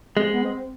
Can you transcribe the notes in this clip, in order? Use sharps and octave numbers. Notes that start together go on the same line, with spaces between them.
G#3 C4
B3
C4